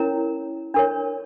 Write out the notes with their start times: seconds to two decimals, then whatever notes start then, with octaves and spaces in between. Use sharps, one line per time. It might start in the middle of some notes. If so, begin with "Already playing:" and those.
Already playing: C#4 E4 A#4 C#5 A#5
0.74 D4 A#4 C#5